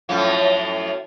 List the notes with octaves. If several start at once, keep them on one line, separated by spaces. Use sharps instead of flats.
F#2 A2 F3